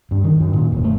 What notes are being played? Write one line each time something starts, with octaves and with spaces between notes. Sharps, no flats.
G2
D#3
F#2
A#2
E1
A3